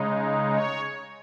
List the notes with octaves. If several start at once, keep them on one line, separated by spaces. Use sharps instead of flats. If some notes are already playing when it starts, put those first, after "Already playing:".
Already playing: C#3 G#3 D#4
C#5